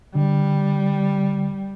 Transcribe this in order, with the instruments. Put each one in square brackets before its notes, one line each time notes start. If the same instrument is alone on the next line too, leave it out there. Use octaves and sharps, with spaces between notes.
[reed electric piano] D3 [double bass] G3